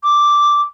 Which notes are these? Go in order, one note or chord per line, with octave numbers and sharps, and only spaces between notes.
D6